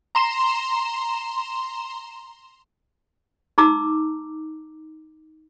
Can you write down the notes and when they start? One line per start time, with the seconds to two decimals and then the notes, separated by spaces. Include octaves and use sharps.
0.15 A#5 C6 E7
3.58 D#4 A#5 D6 E6